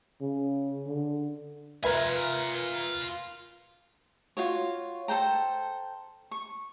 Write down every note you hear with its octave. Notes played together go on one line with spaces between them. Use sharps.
C#3
D3
F4 A#4 B4 E5 G#5
F4 F#4 C#5
A4 C5 G5 A#5
C#6